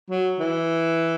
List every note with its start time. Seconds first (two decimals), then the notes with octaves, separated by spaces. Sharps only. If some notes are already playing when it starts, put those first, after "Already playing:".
0.11 F#3
0.40 E3